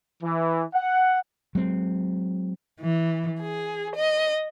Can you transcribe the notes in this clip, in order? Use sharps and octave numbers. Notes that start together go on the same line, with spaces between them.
E3
F#5
F#3 G#3 C4
E3
G#4
D#5